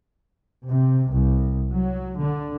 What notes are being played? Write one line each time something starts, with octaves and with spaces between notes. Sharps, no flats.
C3
C2
F#3
D3